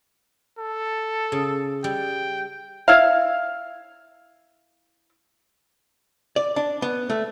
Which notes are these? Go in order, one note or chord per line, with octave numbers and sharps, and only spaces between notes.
A4
C#3
G3 G5
E4 F5
D5
D4
B3
A3